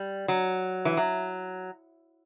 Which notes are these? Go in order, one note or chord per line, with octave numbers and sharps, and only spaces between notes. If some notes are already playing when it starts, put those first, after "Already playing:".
Already playing: G3
F#3
E3
F#3